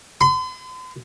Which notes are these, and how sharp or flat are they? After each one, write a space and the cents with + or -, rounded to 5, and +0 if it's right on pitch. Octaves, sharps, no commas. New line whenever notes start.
C6 -45